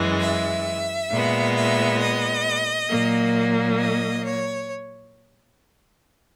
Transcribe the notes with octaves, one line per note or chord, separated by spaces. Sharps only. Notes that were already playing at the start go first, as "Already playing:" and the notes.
Already playing: F#2 E3 G#3
E5
A#2 G#3 B3
E5
D#5
A#2 F#3 A#3
D#5
C#5